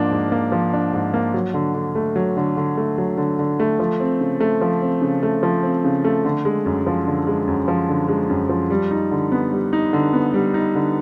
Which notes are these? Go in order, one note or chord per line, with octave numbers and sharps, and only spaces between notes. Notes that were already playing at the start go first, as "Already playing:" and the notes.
Already playing: G#2 F3 A#3 D4
G#2
A#3
F3
D4
G#2
A#3
F#3
D3
D3
A3
F#3
D3
D3
A3
F#3
D3
D3
A3
F3
C4
C#3
A3
F3
C4
C#3
A3
F3
C4
C#3
A3
D3
G#3
F#2
F3
D3
G#3
F#2
F3
D3
G#3
F#2
F3
G3
D#4
D3
B3
G3
D#4
D3
B3
G3
D#4
D3